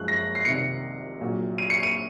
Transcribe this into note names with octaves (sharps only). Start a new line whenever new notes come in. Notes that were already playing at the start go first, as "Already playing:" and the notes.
Already playing: F#2 F3 G#3 F#6
A#6
C7
C2 C3 D#3 C#7
A#1 A#2 F#3
D#7
C#7
D#7